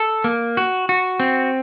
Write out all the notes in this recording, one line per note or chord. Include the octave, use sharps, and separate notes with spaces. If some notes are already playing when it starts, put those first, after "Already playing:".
Already playing: A4
A#3
F#4
F#4
C4